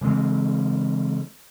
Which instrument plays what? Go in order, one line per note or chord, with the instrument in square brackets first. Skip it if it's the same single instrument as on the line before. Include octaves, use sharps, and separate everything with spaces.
[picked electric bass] C#3 E3 G#3 C4